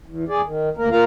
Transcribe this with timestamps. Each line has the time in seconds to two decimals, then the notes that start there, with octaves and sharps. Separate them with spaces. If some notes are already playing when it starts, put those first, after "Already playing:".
0.06 E2
0.28 E2 G#4 D5
0.46 D#3
0.77 D2 A#3 A#4
0.91 A#3 F4 A#4 F5 A#5